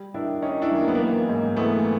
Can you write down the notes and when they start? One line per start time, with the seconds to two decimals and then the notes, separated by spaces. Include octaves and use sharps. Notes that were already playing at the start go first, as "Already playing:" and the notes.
Already playing: G3
0.14 D#3 D4 E4
0.42 D#3 C#4 D#4
0.62 D4 E4
0.71 F#2
0.81 A#3
0.88 B3
0.95 E3 A#3
1.29 G#2
1.56 E3 A3 B3